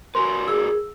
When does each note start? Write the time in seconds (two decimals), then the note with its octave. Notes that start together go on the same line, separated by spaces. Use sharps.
0.15 F#4 A#4 B4 C6
0.48 G#4 E6